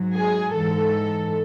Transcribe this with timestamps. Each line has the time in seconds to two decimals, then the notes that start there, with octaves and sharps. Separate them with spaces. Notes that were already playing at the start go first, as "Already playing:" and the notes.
Already playing: G#2 F#3
0.16 G#4
0.55 G#2 E3 A4